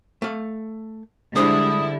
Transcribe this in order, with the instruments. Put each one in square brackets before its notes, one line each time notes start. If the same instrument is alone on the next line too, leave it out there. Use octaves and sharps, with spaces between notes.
[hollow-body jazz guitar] A3 F5
[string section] D3 G3 E4 [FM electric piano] G#3 [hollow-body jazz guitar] D4 G#4 C5 [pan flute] D#6